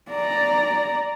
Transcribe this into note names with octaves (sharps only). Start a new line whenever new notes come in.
D5 A#5